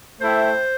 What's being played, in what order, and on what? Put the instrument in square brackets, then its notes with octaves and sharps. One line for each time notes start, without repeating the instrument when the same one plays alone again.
[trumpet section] A3 E4 A4 E5 G5 [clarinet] C5